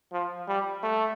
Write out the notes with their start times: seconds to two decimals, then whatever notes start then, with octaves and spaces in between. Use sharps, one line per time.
0.12 F3
0.48 G3
0.83 A3